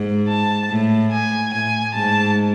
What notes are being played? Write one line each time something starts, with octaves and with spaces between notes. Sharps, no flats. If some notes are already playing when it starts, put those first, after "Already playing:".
Already playing: G#2
A5
A2
G#5
A2 G#5
G#2 A5